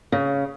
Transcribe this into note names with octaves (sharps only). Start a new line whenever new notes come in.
C#3